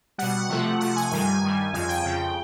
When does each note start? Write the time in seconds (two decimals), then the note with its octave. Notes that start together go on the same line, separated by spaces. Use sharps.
0.18 B2 G3 F#5
0.49 C3 F3 A3
0.80 C3 F3 A3 F#5
0.96 G#5
1.11 G2 D#3 G3 G#5
1.43 G2 D#3 G3
1.73 F2 C#3 F3 G#5
1.89 G5
2.04 F2 C#3 F3